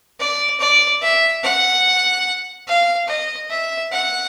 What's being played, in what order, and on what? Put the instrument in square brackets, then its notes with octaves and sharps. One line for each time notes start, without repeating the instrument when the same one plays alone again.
[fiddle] D5
D5
E5
F#5
F5
D#5
E5
F#5